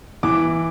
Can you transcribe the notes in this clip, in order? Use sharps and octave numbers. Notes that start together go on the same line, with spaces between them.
E3 D6